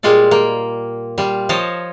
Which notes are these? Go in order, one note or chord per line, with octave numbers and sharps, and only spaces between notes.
A#2 G3 G#3 F4 A4 D5
A#3 G5
G3 F4
F3 C5 C#5 D#5 A5